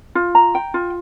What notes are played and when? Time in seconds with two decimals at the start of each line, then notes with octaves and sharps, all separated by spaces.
0.15 F4
0.35 A#5
0.55 G5
0.74 F4